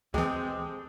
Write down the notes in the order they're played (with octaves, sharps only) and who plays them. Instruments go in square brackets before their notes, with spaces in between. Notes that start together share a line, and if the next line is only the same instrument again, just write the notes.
[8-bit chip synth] D2 E3 [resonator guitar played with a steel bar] G#3 [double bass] C4 [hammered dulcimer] G4 A4 D#5